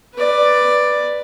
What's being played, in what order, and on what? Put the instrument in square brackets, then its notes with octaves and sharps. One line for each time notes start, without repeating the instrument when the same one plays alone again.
[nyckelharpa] B4 D5